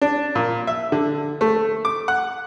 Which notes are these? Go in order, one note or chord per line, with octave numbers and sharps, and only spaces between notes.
D4
A#2
E5
D3
A3
D6
F#5